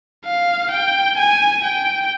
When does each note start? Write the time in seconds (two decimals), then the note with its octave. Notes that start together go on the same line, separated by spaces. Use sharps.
0.25 F5
0.71 G5
1.18 G#5
1.65 G5